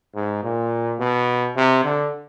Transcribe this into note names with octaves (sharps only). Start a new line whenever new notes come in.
G#2
A#2
B2
C3
D3